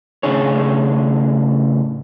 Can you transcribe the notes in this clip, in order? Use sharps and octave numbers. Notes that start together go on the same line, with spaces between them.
A2 C#3 D4 G#4 C#5